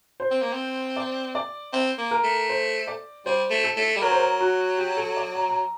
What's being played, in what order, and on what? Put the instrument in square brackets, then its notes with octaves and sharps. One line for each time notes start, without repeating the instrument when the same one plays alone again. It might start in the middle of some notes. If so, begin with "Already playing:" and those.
[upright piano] C5
[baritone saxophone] C4
A#3
C4
[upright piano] D5
D5
[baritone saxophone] C4
A#3
[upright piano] A#4
[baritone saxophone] A3
[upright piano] C5
D5
[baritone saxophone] G3 [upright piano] C5
[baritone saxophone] A3
[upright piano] A4
[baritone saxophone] A3
G3
[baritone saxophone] F#3 [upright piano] A#4
[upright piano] C5
A#4
F#4
G4
A4
D5
A#5
A#5